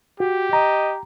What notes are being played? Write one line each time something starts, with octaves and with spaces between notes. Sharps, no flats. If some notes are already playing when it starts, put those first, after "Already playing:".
F#4 G4
D#5 A#5